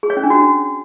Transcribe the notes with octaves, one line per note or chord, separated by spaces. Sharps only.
G#4
C#5
C#4
D4
F#4